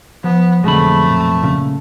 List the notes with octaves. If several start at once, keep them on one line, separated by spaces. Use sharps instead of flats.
F3 B3
B1 F2 D3 G#3 A3 B5
A#2
A#2 C#3